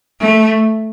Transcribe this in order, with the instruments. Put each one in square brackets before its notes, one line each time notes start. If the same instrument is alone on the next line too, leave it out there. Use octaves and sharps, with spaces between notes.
[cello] A3